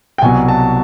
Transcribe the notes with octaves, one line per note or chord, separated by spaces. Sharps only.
G5
C2 B2 F#3 G#5
A5